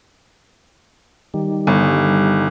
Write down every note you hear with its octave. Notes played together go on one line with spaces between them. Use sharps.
D#3 G3
G1